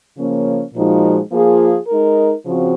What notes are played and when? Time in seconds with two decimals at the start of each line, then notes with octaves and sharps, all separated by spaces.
0.17 C#3 F3 A#3 C#4
0.74 A#2 F3 G#3 D#4 F#4
1.31 F3 A#3 F4 G#4
1.88 G#3 D#4 A#4
2.45 C#3 F3 C4 F#4